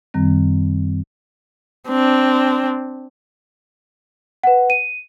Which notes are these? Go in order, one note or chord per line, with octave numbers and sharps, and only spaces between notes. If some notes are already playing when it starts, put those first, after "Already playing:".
F#2 D#3 G3 C4
C4 D4
B4 F#5
D#7